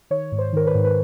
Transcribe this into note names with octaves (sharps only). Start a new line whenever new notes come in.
D#3 C#5
G#2
C5
D#3 A#4
B4
G#2
B4